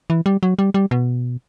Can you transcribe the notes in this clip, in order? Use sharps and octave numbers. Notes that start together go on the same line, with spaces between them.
E3
G3
F#3
G3
G3
B2